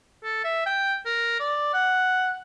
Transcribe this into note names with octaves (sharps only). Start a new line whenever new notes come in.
A4
E5
G5
A#4
D5
F#5